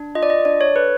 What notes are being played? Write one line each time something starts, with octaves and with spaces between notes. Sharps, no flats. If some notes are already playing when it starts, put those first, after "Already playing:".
Already playing: D4
F4 D#5
D5
D#5
D4 D5
C#5
A4 B4